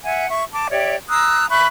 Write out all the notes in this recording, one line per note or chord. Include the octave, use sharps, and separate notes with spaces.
E5 F#5 G#5
E5 C#6
A5 D6
G4 C#5 D5 E5
A#5 D#6 E6 F#6
E5 B5 C#6 F#6